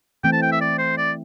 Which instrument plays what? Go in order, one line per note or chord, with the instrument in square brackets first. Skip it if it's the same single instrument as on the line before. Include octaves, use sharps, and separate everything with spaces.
[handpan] E3 A3 C4 [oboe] G5
[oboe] A5
G5
E5
D5
C5
D5